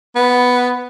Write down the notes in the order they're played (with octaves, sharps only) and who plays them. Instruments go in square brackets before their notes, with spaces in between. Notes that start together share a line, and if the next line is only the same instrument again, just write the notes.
[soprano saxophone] B3